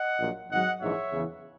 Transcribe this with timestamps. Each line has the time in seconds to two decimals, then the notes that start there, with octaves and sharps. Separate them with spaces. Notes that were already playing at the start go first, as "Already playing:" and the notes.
Already playing: D#5 F#5
0.19 A#1 A#2 F#3
0.50 G#1 G#2 F#3 D#5 F#5
0.81 A#1 G#2 E3 G#3 C#5 E5
1.12 E2 C#3 E3